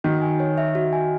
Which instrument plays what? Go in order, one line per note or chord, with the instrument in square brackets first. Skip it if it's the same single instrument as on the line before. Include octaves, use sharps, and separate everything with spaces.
[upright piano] D#3 [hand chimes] F#4
[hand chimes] G#5
C#5
E5
F#4
G#5